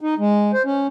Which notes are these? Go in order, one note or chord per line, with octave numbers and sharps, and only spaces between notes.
D#4
G#3
C5
C#4